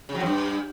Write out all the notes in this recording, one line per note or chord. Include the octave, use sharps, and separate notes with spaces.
C#3
F#3
F2
G2